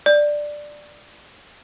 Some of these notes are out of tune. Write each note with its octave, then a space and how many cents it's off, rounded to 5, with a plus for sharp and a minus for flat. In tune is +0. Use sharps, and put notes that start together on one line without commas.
D5 +10